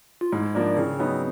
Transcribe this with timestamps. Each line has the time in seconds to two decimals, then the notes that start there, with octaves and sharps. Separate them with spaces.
0.21 F4
0.32 G#2 E4
0.55 F3 A#3 D4
0.77 C#3 C4
0.99 F#3 B3 D#4